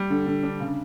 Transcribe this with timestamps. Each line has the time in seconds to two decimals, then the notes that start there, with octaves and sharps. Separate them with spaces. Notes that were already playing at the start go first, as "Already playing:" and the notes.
Already playing: G3
0.10 D3
0.26 D3
0.43 D4
0.60 C#3